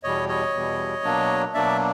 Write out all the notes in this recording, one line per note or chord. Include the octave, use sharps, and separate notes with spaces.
E2 B2 G3 C#5 D#5
C#5 D#5
E2 B2 G3
B2 F#3 A#3 D4
B2 F#3 A#3 D4 D5 E5